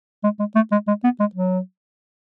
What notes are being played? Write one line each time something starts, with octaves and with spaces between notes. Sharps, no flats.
G#3
G#3
A3
G#3
G#3
B3
G#3
F#3